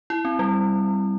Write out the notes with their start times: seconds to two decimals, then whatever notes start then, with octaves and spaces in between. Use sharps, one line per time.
0.10 E4
0.25 C4
0.39 G3